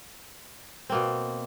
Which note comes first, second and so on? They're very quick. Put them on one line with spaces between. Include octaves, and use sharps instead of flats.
C4 A#3 B2